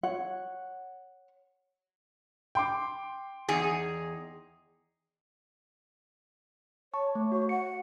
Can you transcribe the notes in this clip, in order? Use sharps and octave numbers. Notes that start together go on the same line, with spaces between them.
C#5 F#5
G5 C6 D6
E2 D#4 G#4
C#5 A5 C#6
A3
F#4 C#5
F#5 C#7